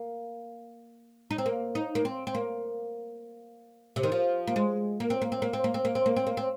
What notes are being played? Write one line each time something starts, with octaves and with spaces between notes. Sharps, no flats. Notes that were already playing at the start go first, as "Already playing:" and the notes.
Already playing: A#3
D#4
C4
A#3
D#4
A#3
C4
C4
A#3
C3
D#3
F3
A#3
G#3
A#3
C4
A#3
C4
A#3
C4
A#3
C4
A#3
C4
A#3
C4
A#3
C4